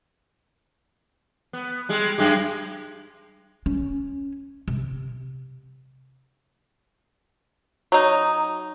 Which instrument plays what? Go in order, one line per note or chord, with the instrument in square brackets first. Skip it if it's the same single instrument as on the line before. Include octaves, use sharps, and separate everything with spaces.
[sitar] B3
G3 G#3
F#2 G#3 G4
[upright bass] C#4
C3
[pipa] F#3 D#4